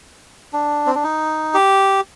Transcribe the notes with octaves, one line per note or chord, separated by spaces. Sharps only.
D4
C4
D4
D#4
G4